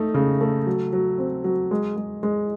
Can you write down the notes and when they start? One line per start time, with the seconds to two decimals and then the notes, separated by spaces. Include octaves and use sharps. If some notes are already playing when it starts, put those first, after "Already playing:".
Already playing: A3 D#4
0.14 C#3
0.41 A3
0.67 F#3
0.93 F#3
1.18 C4
1.44 F#3
1.71 G#3
1.96 G#3
2.23 G#3